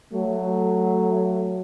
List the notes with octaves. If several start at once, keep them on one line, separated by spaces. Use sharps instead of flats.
F#3 A3